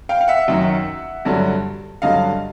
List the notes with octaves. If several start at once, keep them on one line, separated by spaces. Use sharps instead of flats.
F5 G5
F5
E5 F#5
F#2 D#3 F#3
G2 D3 F#3
G2 D3 F#3 D#5 F5